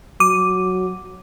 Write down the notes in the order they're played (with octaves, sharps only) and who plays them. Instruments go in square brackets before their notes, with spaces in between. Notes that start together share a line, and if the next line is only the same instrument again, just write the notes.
[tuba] F#3 [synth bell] D6 D#7